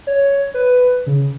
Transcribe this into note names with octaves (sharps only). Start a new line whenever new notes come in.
C#5
B4
C#3